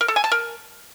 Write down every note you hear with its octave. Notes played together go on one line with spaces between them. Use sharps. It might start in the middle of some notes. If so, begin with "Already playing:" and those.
A#4
A4
G#5
A5
A#4